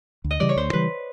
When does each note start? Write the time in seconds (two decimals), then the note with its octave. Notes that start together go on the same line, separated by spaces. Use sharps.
0.24 D2
0.31 D#5
0.40 C#3 E3 G3 D5
0.49 C#5
0.56 D2 C5
0.73 C#3 E3 G3 B4